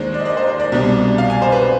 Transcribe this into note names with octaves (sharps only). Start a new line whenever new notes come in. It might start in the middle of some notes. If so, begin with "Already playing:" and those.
Already playing: D#2 D#3 G#3 D4 C5
D5
D#5
D5
C5
C5
D5
C2 B2 G3 D4
F5
G#5
C5
B4